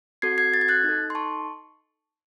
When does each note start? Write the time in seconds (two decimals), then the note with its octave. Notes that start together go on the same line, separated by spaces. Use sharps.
0.22 C4 F#4 A4 G#6 C7
0.38 G#6 C7
0.54 A6
0.61 G#6
0.68 F#6 A6
0.84 D#4 A4
1.10 C6
1.15 A5 C#6